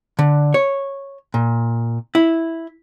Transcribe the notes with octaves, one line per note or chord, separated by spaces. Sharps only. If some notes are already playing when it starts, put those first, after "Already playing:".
D3
C#5
A#2
E4